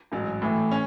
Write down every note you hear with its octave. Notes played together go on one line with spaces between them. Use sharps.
A1 G#2 F#3
A2 E3 A3
C#4